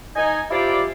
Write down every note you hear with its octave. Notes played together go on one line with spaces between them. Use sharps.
D#4 G#5
E4 F4 G4 C5 D5